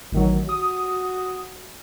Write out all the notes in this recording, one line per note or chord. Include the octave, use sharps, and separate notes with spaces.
A1 D#3 F#3
F#4 D#6